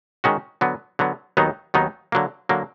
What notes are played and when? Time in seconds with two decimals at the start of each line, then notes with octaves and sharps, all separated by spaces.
0.24 D#3 G#3 C#4 F#4
0.61 D3 F#3 B3
0.99 D3 F#3 B3
1.37 D#2 D#3 F#3 B3 D#4
1.74 D#2 D#3 F#3 B3 D#4
2.12 D3 F#3 A#3
2.49 D3 F#3 A#3